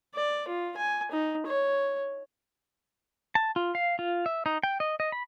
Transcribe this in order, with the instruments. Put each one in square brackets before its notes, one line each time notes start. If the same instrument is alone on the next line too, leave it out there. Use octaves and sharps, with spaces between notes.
[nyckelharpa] D5
F4
G#5
D#4
C#5
[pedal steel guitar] A5
F4
F5
F4
E5
D#4
G5
D#5
D#5
B5